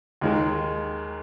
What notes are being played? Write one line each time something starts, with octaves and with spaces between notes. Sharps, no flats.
D#2 D#3 G#3